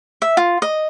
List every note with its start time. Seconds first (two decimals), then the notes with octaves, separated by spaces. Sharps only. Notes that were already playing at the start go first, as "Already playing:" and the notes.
0.22 E5
0.37 F4
0.62 D#5